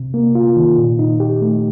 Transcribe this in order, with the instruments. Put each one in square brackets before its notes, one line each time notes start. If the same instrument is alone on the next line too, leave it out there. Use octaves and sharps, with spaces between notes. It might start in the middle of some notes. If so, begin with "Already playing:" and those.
Already playing: [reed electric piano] C3
A#3
F4
D#3
A#2
D#4
G4
A3